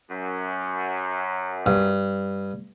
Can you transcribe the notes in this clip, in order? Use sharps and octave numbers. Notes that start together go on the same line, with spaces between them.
F#2
G2